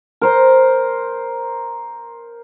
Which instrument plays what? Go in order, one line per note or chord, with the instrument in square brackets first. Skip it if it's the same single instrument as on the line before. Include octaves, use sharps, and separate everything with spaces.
[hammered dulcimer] A#4 C5